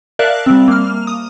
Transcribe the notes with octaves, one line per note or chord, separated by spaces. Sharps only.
A#4 D5 E5 F5 A5 F#6
G3 C4
A#3 F6
D#6